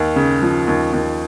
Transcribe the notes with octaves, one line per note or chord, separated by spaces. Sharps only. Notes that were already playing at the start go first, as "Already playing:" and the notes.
Already playing: D#2
C#3
F3
D#2
D#2